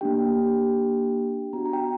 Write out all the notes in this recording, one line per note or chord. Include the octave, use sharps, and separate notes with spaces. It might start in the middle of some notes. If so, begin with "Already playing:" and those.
A#3 D4 G4 G5
B3 D4 F#4 A#5
A#5
G5